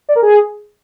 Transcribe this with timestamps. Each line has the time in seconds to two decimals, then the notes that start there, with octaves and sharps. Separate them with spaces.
0.09 D5
0.16 A#4
0.22 G#4